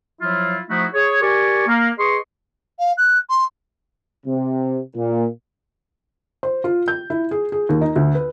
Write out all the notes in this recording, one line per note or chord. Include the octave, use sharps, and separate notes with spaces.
F3 F#3 E4 F4
F3 A3 D#4 E4 F#4
G#4 C#5
G4 A#4 D5 G#5 C#6
A#3
G#4 B4 D#5 C6 C#6
F5
F#6
C6
C3
A#2
C5
F4
G6
E4
G#4
G#4
D#2
D#4
D2
B4